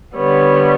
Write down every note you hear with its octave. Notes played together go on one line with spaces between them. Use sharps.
D3 G3 B3 C#5